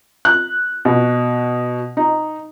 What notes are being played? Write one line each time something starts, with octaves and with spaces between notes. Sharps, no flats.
F#6
B2
D#4